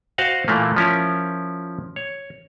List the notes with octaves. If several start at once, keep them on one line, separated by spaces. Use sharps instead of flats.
F#4 C5 D#5 F5 F#5
A#2 E3 A3 A#3
F3 C#4 E4 A#4
C#5